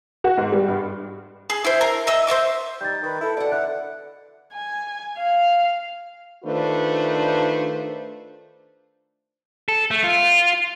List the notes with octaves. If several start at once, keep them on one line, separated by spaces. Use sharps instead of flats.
F#4
G#2
G3
G2
G#4
E4 C5
A#4
D#5 E5 E6
C5 D#5 E5 D6
G3 D#4 G6 A6
D#3 B4
E4 A4
B2 D5 F#5
D3 E5 F#6
G#5
F5
D#3 A3 D4 F4 B4 C5
A4
A3
F4